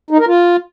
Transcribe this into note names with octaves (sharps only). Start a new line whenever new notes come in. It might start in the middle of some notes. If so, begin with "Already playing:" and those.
D#4
A#4
F4